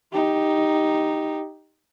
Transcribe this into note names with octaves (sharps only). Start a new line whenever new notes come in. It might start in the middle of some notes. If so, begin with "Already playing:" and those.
D#4 G4